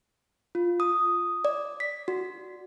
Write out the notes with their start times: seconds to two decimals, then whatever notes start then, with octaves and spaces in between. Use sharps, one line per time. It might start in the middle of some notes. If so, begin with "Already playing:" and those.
0.55 F4
0.80 D#6
1.45 D5
1.80 B6
2.08 F#4